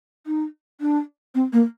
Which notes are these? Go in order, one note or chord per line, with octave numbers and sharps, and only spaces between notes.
D#4
D4
C4
A#3